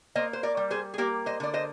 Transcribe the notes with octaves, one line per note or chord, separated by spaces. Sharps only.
A#3 C5 D#5
C5
A#4 D5
G3
G#4 C5
G#4
A#3 G4 A#4
C5 D#5
D3 D5
C5 D#5